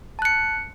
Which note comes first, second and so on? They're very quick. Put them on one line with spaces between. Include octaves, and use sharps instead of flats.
A5 F#6 C#7